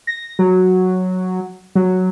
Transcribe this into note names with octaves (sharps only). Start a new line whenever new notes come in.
A#6
F#3
F#3